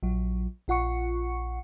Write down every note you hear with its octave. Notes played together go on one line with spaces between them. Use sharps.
A#1 F#3
A#1 F4 F#5 C#6 C#7